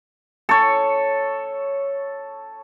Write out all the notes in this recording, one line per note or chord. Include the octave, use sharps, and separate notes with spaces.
A4 C#5